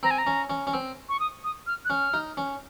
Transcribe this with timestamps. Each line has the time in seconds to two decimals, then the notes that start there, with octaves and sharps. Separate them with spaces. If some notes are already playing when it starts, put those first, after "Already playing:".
0.03 C4 A#5
0.11 G#5
0.18 A#5
0.27 C#4
0.50 C#4
0.67 C#4
0.73 C4
1.09 C#6
1.20 D#6
1.44 D#6
1.67 F6
1.85 F#6
1.90 C#4 F6
2.14 D#4
2.37 C#4